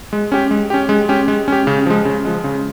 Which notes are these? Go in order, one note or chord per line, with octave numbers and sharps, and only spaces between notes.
G#3
C#4 G4
G#3
C#4 G4
G#3
C#4 G4
G#3
C#4 G4
C#3
F3 G#3
C#3
F3 G#3
C#3